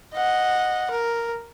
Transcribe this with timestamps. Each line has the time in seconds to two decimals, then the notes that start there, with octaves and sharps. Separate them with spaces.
0.13 D#5 F#5
0.91 A#4